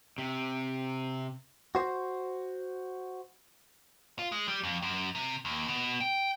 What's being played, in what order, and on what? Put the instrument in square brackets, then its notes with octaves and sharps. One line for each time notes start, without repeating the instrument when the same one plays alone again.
[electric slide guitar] C3
[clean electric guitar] F#4 C5
[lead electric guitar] F4
G#3
G3
F2
F#2
C3
D#2
B2
G5